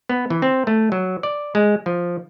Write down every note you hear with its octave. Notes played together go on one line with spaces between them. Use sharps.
B3
E3
C4
A3
F#3
D5
G#3
F3